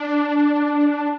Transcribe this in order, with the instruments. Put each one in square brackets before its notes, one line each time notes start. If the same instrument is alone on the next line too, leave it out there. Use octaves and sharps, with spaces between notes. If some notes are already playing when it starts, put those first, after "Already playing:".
Already playing: [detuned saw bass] D4